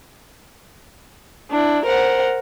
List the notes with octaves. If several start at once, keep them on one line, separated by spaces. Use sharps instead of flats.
D4 E4
A#4 C5 F#5